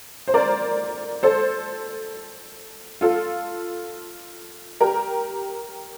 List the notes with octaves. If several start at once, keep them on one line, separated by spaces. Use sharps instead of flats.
C5
A#4 D5
A4 C5
F4 A4
G4 A#4